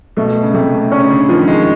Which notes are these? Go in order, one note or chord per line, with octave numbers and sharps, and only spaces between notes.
B2 A3
C#3
C3 A3
C#3 C#4
C#3
D3
D#3 F3
G#3